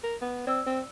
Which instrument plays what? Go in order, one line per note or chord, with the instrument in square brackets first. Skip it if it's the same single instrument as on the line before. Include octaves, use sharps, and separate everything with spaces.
[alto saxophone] A#4
B3
[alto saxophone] C4 [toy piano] D5 E6
[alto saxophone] C4